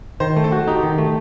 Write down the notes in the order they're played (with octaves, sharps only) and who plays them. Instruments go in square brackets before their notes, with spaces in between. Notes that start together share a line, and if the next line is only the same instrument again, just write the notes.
[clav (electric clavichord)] D#3 [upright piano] C5
[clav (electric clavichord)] A3
[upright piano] A4
[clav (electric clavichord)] F#4
[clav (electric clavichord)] D#4 [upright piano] G4
[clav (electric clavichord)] D#3
A3